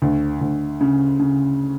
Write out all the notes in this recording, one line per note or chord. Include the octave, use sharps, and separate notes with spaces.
D2
D2
C#3
C#3